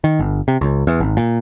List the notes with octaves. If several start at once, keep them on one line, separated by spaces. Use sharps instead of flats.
D#3
G1
C3
C#2
E2
G#1
A#2